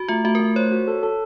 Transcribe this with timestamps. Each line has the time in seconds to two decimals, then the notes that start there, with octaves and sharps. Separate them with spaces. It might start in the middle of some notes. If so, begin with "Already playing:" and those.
Already playing: F#4
0.08 A3 F4
0.25 A3 F#4
0.35 A#4
0.40 A3
0.56 C5 C#5
0.71 F#4
0.88 A4
1.03 A4